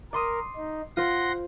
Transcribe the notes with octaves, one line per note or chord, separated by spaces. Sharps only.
A#4 D5 C6 D#6
D#4
F4 C5 F#5 C6 A#6